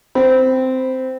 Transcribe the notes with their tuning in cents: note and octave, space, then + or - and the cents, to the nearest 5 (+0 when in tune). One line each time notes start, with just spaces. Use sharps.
C4 -10 B5 +0